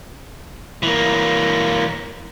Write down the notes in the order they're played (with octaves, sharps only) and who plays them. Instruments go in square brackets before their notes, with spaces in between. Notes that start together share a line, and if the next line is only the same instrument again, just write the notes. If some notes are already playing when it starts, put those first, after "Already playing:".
[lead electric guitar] E3 A#3